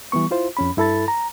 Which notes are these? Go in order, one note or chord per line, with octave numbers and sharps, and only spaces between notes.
E3 G3 B3 C#6
E4 F4 C5
F2 C#4 B5
G2 E4 A4 B5 A6
A#5